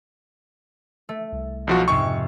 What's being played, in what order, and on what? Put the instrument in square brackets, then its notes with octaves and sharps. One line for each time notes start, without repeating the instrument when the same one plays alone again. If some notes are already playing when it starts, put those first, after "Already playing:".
[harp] A3
[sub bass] C2
[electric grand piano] B1 F3 F#4
[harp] F2 G#2 C3 [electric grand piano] C#6